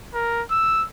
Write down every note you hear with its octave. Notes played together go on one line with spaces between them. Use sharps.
A#4
E6